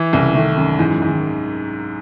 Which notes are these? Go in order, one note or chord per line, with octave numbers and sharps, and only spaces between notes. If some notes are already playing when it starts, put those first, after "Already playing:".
Already playing: E3
C2 C#3
D#3 A3
F#2 D#3
G#2 E3
E3
G#2
D#3